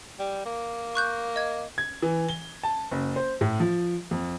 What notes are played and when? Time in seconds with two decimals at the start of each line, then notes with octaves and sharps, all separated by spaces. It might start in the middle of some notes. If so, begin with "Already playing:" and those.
0.19 G3
0.46 A#3
0.95 C#6 F#6 G6
1.36 D#5 G#6
1.78 G#6
2.02 E3
2.29 G7
2.63 A5
2.91 F#1
3.16 C5
3.41 A2
3.60 F3
4.11 F2